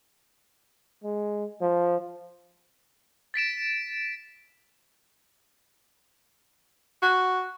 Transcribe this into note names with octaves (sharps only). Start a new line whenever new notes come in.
G#3
F3
A6 B6 D7 E7
F#4